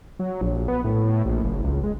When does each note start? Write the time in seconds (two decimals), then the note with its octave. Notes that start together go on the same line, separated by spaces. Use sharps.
0.19 F#3
0.41 A#1
0.68 B3
0.84 A2
1.25 A#1
1.44 F#1
1.64 C#2
1.84 G#3